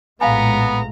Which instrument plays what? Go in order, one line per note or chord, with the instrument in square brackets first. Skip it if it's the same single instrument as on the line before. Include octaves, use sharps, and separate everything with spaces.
[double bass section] A#1 A2 G#3 [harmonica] B3 [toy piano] F5 G#5 [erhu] A#5